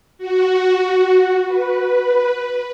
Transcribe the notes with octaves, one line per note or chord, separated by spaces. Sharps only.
F#4
B4